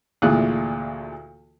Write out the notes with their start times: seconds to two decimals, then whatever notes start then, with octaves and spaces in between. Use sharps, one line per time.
0.22 D2 A#2 E3 F4 G#4 F#6